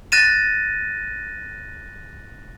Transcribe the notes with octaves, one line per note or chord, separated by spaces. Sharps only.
F#6 A6 A#6 D#7 E7